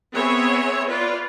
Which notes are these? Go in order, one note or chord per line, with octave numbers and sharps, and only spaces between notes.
B3 C4 G#4 C#5 E5
F4 B4 D5